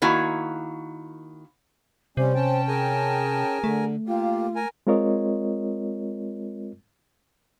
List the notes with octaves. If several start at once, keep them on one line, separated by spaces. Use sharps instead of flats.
D#3 A#3 E4 F#4 G#5
C3 G3 C#4 C5
C#4 G5 A5
G#4 A#4 G#5
D3 A3
A#3 F4 G4
A#4 G#5
G#3 C4 F4 A#4 C#5 D#5